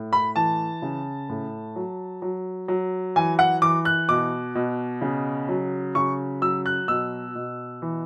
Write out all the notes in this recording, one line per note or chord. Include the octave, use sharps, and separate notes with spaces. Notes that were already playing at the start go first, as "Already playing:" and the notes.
Already playing: A2
B5
E3 A5
C#3
A2
F#3
F#3
F#3
E3 G#5
F#5
E3 D6
F#6
B2 D6
B2
C#3
F#3
C#3 C#6
F#3 E6
F#6
B2 E6
B2
E3